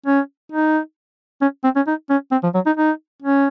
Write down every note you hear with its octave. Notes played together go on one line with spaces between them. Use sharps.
C#4
D#4
C#4
C4
C#4
D#4
C#4
C4
F3
F#3
D#4
D#4
C#4